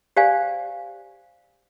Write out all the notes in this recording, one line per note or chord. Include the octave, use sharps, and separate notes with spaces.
G4 C5 D5 F5 G#5